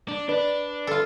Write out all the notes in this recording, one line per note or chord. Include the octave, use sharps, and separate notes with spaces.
D4
D4 B4 D5
F4 A4